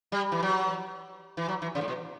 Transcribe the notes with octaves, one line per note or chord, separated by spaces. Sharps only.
G3
E3
F#3
E3
F#3
E3
C#3
A2
B2